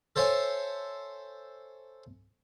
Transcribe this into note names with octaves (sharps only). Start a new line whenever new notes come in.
A4 C5 C#5 E5 G#5